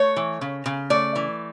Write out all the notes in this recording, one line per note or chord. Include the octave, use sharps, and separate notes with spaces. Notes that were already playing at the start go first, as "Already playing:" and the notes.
Already playing: A3 C#5
E3
C#3
C#3
A3 D5
E3